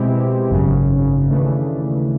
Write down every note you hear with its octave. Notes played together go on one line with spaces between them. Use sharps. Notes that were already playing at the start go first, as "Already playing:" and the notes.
Already playing: B2 G#3 C4 E4 G4
G#1 F#2 C#3
D#2 C#3 E3 A3 D4